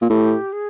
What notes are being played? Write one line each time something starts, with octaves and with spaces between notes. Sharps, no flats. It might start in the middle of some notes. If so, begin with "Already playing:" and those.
A#2
A2 G4
G#4